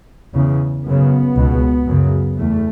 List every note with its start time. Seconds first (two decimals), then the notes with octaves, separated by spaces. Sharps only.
0.34 E2 C#3
0.85 F#2 C#3 B3
1.36 C#2 B2
1.87 F#2 C#3
2.39 E2 A3